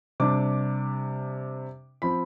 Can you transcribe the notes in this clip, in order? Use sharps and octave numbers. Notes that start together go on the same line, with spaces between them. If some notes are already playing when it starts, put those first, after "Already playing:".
C3 G3 D4 D6
F3 C4 B5